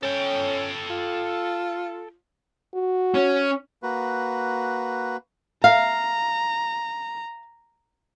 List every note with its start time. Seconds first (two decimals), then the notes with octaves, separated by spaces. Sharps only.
0.03 C#4 A4 G5
0.90 F4
2.75 F#4
3.14 C#4
3.83 A#3 F#4 B4
5.64 F5 A#5